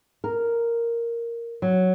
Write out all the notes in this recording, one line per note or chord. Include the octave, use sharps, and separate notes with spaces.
A#4
F#3